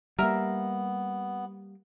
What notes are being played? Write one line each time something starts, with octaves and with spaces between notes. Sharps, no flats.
G3 G#3 A#3 B3 A#4 E5